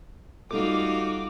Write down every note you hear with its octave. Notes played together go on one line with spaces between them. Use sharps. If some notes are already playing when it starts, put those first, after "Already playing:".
G3 A3 D#4 F4 F#4 A4 D6